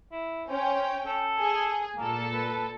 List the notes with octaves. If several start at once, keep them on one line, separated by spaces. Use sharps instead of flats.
E4
C#4 C5 G5
A4
G#4
A#2 A#3 A4
B4